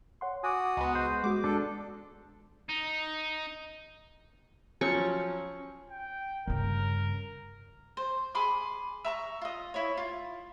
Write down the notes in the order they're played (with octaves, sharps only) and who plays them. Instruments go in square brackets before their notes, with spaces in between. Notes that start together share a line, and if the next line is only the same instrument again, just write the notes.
[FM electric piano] C#5 F#5 C6
[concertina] F#4 D#6 [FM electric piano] G#5 D6
[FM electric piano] C#2 A#5 [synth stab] G#3 B3
[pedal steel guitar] C5
[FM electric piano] G#3 F#4 [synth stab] D6
[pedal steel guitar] D4 [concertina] A4
[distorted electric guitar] D#4
[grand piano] F3 F#3 [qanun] C#4 C#6
[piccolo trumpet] G5
[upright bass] G2 C#3 [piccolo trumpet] A#4
[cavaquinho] C5
G#4 B5 C6 D6
E5 A#5 C#6
F4 D#5
E4 C#5
F4